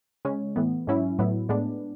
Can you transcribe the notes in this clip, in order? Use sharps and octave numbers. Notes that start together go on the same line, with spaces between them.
C#3 G#3 C#4
A2 E3 B3
G#2 F#3 C#4 E4
A2 F#3 B3 E4
A2 G#3 B3 D4